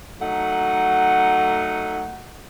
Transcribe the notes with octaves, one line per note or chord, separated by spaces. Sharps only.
F#3 A3 D#4 F#5